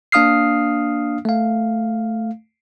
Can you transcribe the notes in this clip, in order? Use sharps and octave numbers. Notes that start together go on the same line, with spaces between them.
A#3 D4 F5 D#6 F6 C7
A3 F5